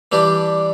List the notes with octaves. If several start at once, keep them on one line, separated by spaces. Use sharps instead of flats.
E3 G3 D4 G4